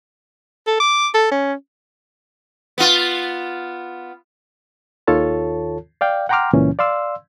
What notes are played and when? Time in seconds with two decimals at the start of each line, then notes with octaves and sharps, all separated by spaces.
0.67 A4
0.80 D6
1.15 A4
1.31 C#4
2.78 B3 F4
5.07 D#2 D#3 F4 A4 C#5 A5
6.01 D5 F5 G5
6.29 F#5 G5 A#5 C6 D6 F6
6.53 C#2 A#2 E3 C#4
6.79 D5 F5 C6 E6